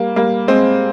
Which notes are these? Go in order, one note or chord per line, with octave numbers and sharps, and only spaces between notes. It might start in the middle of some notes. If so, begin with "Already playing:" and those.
Already playing: G3 A#3
G3 A#3
G#3 C4